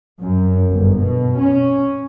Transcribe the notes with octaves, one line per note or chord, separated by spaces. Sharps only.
F#2
G1
B2
C#4